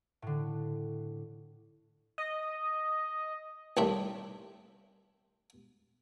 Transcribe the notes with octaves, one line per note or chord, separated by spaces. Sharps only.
A2 D3
D#5
C2 A2 D#3 D4 E5